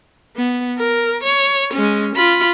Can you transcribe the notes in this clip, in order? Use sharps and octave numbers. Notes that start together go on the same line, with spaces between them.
B3
A#4
C#5
G#3 C#4
F4 B5